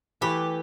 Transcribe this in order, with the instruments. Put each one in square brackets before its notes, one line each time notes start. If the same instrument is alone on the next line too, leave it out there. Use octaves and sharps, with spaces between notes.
[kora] E3 A3 E4 B4 [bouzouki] G4